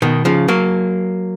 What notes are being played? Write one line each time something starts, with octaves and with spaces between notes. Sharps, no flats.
B2 D#3
C#3 F3
F#3 A#3